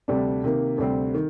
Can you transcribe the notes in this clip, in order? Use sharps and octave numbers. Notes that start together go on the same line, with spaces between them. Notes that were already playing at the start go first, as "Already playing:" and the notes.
D2 C3 G3 D4
C3 D#3 A#3
D2 C3 G3 C4
D#3